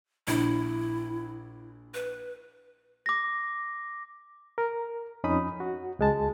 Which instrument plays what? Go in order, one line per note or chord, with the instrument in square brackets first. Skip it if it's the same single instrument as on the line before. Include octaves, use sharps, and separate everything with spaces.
[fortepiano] A#1 [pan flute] E4
[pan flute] B4
[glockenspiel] D6 A#6
[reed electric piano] A#4
F2 C#4 D#4 B5 D#6
F#4
C#2 G#3 A5